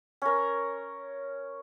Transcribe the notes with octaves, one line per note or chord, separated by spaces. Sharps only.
C#4 A#4